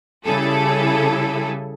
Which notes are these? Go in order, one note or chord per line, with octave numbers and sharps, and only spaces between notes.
C#3 G3 E4 G#4 A4